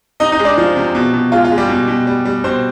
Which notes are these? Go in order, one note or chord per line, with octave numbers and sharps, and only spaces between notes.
C3 D#4 D#5
D#4 D#5
G#3
D4 D5
F3
C3
B2
B2
G#3 F4
F4
G#3
G3 G4
B2
B2
G3
G3
B2 C4 C5